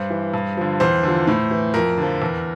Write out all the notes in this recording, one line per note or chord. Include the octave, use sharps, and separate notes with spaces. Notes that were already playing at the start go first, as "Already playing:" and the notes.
Already playing: G2 C5
E3
G2
D3 F3
E2 C5
D3 F3
A2
E3
F2 A#4
D3 F3
E2